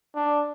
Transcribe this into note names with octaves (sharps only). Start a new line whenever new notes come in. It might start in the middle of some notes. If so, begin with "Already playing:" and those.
D4